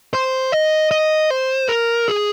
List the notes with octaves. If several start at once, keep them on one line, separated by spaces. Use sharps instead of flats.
C5
D#5
D#5
C5
A#4
G#4